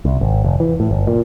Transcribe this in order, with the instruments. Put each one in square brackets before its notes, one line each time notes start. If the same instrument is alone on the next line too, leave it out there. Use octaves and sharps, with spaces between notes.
[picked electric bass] C2
G#1
F1
E3
A2
G1
A#2